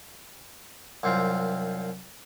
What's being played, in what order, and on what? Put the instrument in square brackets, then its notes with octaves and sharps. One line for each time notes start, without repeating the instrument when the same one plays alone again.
[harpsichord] C2 F#2 C4 F4